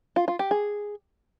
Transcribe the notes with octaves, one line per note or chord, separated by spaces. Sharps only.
F4
F4
G4
G#4